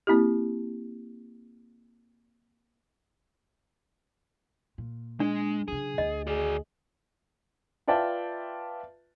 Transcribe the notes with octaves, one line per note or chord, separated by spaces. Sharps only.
A#3 C4 E4 G4
A#2
G#3 D4
C#3 F#3 G#4
D2 D#5
F#4 G#4 D5
F4 B4 D5 E5 G5 A5